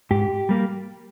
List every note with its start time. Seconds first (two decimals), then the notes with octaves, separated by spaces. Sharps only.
0.11 G#2 G4
0.49 G3 A#3